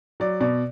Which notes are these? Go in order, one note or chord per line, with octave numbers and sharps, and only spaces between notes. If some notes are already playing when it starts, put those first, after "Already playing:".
F#3 D5
B2 D5